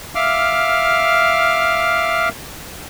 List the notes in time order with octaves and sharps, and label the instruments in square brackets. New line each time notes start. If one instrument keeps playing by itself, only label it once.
[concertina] E5 F5 D6 F6